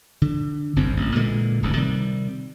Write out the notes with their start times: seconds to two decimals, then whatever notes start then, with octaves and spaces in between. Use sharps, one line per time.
0.22 D3
0.76 G1 C2 F#2 C4
0.96 A1
1.15 A#2 D3 E3 G#3
1.63 D1 C#2 G#2 B2
1.77 C3 D#3 G3